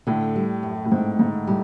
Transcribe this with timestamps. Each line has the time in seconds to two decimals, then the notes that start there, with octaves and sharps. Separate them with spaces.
0.07 A2 D3
0.36 G3
0.63 F#2
0.85 A2
0.91 G#2 C4
1.19 G#2 D3
1.47 A2 G3